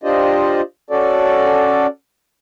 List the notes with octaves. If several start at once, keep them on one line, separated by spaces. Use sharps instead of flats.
D4 F4 G4 C5 D5 D#5
C#4 F#4 A4 D5